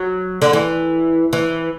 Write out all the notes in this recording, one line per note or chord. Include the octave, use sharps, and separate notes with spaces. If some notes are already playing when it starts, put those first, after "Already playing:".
Already playing: F#3
D3
E3
E3